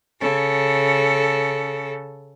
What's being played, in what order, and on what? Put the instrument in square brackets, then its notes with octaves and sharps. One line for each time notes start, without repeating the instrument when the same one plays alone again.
[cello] C#3 A4